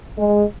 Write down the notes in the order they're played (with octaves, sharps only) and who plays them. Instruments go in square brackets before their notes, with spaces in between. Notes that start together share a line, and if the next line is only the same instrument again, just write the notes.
[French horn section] G#3